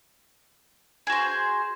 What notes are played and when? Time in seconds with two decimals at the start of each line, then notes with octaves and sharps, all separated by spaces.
1.07 G#4
1.10 F#4
1.12 C5